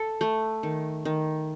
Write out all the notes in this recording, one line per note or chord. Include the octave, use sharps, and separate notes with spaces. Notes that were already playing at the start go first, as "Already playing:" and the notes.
Already playing: A4
A3
D#3
D#3